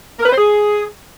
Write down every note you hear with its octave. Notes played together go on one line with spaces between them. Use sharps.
A#4
B4
C5
G#4